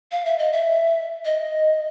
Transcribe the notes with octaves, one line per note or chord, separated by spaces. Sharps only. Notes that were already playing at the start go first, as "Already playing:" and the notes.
F5
E5
D#5
E5
D#5